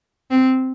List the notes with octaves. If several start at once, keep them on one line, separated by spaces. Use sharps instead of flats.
C4